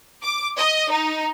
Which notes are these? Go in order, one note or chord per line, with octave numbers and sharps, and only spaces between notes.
D6
D#5
D#4